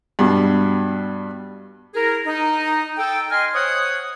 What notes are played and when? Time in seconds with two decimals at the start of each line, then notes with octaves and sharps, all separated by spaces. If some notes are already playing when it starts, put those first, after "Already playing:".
0.19 G2 B2
1.94 E4 G#4 A#4
2.26 D#4
2.97 A4 G5
3.31 D#5 G#5 C6 F6
3.54 C5 C#5 F#5 D#6